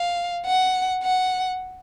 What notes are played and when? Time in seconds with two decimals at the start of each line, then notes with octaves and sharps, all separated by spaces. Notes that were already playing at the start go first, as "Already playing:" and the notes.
Already playing: F5
0.46 F#5
1.04 F#5